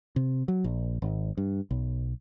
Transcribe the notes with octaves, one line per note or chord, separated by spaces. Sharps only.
C3
F#3
A#1
G#1
G2
B1